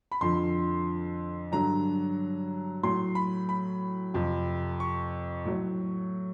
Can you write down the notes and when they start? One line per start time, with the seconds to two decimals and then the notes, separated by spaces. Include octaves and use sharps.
0.12 B5
0.21 F2 D3 F3 C6
1.52 G2 D3 F#3 A#5
2.83 A2 F#3 C6
3.15 B5
3.49 B5
4.14 F2 C3 F3
4.80 C#6
5.45 A2 F#3